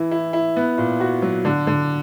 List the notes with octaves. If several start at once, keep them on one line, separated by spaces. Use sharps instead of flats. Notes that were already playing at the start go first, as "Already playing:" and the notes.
Already playing: E3 E4
E4
E4
B3
A#2
F#4
F#3
D3
D3